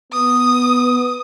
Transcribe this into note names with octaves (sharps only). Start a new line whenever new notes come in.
B3 D#6